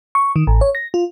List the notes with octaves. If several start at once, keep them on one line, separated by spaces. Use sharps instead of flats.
C#6
D#3
A1
C#5
A#6
F4